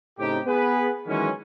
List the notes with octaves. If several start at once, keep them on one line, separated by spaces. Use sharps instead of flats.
A2 C#3 C4 D#4 G4
B3 G#4 B4
D#3 E3 F#3 G#3 C#4